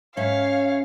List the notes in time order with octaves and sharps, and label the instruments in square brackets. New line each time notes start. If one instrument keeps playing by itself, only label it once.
[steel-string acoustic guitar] G#2 C#4 E5 [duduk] C#5 [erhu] F5